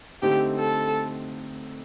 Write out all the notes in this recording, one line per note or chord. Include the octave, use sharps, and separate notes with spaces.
D3 A3 C4 D#4 G4
A4